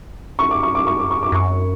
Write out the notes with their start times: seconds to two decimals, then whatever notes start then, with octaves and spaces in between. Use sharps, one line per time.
0.39 C#6
0.51 D6
0.63 C#6
0.75 D6
0.87 C#6
0.99 D6
1.11 C#6
1.23 D6
1.32 F#2 C#6